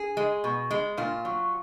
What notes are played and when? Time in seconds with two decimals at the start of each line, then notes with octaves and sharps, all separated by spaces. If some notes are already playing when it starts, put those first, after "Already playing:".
Already playing: G#4
0.17 G#3
0.44 B2
0.71 G#3
0.97 A#2 F4
1.25 F#3